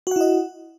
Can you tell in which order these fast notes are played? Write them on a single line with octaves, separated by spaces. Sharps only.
F#4 F#5 E4 D#5